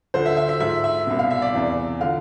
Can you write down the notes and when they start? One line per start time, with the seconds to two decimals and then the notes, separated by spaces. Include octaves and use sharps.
0.14 D2 D3 F3 C5
0.26 E5
0.37 E5
0.49 E5
0.60 G#2 F3 E5
0.84 E5
1.07 C2 B2
1.19 F5
1.31 E5
1.42 D5
1.53 E2 C3 E3
2.01 D3 F3 F5